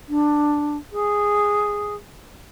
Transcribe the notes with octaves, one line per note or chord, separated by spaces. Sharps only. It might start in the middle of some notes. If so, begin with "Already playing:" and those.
D4
G#4